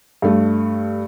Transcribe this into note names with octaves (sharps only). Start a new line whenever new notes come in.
G2 A3